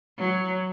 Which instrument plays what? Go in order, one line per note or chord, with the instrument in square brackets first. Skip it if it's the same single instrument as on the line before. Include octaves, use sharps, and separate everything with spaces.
[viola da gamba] F#3